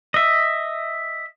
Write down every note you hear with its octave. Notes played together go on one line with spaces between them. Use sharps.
D#5 E5